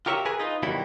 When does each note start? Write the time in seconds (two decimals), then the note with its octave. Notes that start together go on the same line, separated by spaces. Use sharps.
0.06 F4 G4 A#4 C#5 D#5 E5
0.26 G#4 A#4 B4 G#5
0.39 D#4 F4 B4 D#5
0.63 B2 D#3 F#3 G3 E4